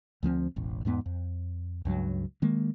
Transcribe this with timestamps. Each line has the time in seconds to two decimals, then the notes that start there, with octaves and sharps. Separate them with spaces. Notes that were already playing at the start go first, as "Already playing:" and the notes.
0.23 D2 F3 A3 C4
0.56 E1 A1
0.85 E2 G#2 G3 B3
1.06 F2
1.85 C#2 G2 F#3
2.42 D#3 G#3 A#3